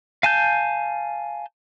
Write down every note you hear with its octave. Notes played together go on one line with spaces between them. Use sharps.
F5 G#5 A5 G6